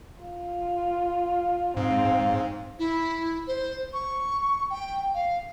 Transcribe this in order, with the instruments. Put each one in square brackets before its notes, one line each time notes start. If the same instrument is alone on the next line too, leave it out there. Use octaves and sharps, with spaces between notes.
[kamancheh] F4
[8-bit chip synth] G#2 [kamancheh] C4 F5
[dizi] E4
C5
C#6
G5
F5